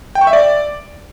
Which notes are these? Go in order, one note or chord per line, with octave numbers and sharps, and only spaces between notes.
G5
C#6
E5
D5